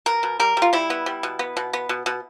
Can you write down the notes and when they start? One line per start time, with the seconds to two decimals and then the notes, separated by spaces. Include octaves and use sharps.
0.06 B2 A#4
0.23 B2
0.40 G3 A#4
0.57 G3
0.62 F4
0.73 G3 E4
0.90 B3
1.06 G3
1.23 B2
1.39 B3
1.57 B2
1.73 B3
1.89 B2
2.06 B2